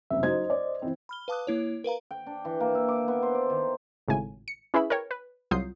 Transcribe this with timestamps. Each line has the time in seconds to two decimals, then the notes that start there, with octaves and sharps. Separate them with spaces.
0.11 F#1 C2 F#2 E5
0.23 F#3 D#4 C5 D#5 G#6
0.50 D5
0.82 E3 C4
1.09 B5 F6 G7
1.28 B4 F5 A5 D6 D#6 F#6
1.47 A#3 E4 C#5
1.84 A#4 B4 F5 A#5
2.11 G5
2.27 D4
2.45 E3
2.60 A#3
2.75 E5
2.88 D6
3.08 B3
3.23 C5
3.35 D5
3.50 D#3
4.08 G#1 A2 C#3 G#5
4.48 C#7
4.74 C#4 E4 G#4 B4 E5 B5
4.90 A#4 B4 C#5 G5
5.11 B4
5.51 C2 F#3 F4 D#6 G6 C7